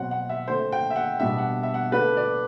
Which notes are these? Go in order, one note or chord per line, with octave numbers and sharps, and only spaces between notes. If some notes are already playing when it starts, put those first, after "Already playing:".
Already playing: B2 F#3 C4 F#5
F#5
E5
D3 A3 C4 C5
G5
E5
F#5
B2 G3 B3 D4 E5
F#5
E5
F#5
D3 A3 D4 B4
D5